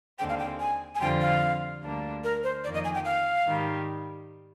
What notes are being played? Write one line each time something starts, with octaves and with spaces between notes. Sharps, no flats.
D#2 D3 G#3 C4 G5
F5
G5
G#5
G#5
F2 D3 G3 C4 F4 G5
F5
D2 D3 G3 A#3 D4
A#4
C5
F2 D#3 A#3 D5
D#5
G#5
G5
F5
G#2 D#3 G3